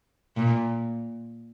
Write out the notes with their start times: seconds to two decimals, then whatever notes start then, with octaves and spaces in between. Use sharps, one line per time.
0.37 A#2